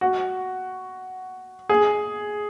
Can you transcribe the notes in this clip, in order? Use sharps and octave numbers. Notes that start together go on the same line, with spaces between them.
F#4
G#4